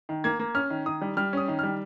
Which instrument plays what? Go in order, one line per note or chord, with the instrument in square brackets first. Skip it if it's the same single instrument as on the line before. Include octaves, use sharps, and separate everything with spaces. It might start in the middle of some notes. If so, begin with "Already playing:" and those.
[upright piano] D#3
A#3 G#6
A#3
C#4 F6
D#3
D#3 D#6
G3
G3 F6
C#4 D#6
D#3
G3 F6